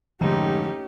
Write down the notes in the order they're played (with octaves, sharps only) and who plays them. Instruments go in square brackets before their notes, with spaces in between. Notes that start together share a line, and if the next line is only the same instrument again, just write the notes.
[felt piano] F1 G#2 [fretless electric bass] D3 F3 [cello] A3 D#4 [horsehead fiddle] C#4 G4